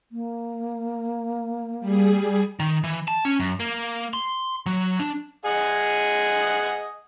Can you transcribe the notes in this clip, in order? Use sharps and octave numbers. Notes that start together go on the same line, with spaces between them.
A#3
G3 G#4
D#3
E3
A5
C#4
F#2
A#3
C6
F#3
D4
G#4 D#5 F#5